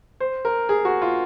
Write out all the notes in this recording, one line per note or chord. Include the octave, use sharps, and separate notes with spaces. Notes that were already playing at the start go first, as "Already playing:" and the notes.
C5
A#4
G#4
F#4
F4